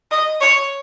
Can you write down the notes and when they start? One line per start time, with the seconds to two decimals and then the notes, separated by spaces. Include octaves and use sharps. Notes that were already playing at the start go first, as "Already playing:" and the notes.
0.11 D#5
0.41 C#5